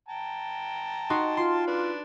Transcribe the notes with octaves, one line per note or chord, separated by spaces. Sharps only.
G5 A5 A#5
D#4 F#4 C6
F4 C6
D4 B4